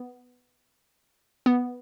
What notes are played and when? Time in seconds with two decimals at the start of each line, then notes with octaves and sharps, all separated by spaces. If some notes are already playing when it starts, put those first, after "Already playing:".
Already playing: B3
1.46 B3